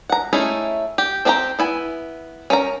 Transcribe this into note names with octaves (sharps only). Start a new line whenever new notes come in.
F#5 A#5
A3 C#4 D#4 E4 G#4
G4
C4 D4 G4 C5 A#5
B3 E4 G#5
C#4 A#4 F5 A#5